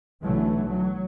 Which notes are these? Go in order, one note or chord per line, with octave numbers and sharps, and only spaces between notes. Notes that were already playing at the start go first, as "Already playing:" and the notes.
B1 D3 E3 F#3 A3
F#3